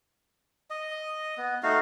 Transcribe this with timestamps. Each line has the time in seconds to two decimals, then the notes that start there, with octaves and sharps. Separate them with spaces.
0.70 D#5
1.38 B3
1.63 A3 D#4 F#4 F5